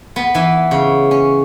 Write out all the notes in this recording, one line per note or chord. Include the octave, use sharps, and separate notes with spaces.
B3
E3
C#3
C#4